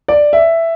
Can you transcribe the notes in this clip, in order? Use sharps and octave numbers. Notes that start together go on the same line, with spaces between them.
D5
E5